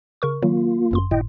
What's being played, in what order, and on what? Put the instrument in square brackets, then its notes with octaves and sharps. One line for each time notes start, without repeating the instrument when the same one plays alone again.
[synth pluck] C#3 A#4 C#6
[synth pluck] D#3 F#3 [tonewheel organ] A#3 F4
[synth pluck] G1 F#2 C6
[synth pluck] G1 A2 [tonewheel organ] E4 D#5 G5